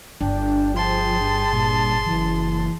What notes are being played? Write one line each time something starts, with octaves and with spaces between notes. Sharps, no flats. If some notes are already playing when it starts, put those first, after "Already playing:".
G1 D4 G5
F3 G#4 A5 C6
G2
G2 A#2
F#1 E3